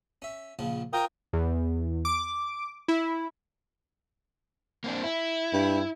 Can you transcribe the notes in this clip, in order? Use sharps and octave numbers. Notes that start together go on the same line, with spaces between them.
C#4 E5
A#1 C#3 F3
F4 A#4 C5 C#5 G5 D#6
E2
D6
E4
A#3 C4 D4
E4
G2